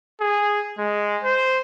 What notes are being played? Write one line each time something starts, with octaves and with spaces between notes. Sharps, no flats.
G#4
G#3
C5